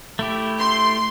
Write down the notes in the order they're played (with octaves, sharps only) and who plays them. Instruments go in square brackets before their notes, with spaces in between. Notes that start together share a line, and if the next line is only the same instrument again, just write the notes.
[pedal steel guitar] A3 E4 G4
[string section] C6